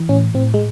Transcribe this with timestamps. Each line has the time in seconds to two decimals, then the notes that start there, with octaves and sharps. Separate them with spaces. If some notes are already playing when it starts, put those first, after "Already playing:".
Already playing: E3
0.09 A2 C#4
0.34 A2 C4
0.54 G#3